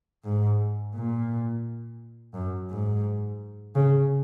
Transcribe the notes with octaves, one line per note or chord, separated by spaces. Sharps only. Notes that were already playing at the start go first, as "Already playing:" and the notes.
G#2
A#2
F#2
G#2
C#3